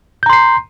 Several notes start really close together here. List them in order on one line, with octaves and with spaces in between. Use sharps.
G6 A#5 C6 C7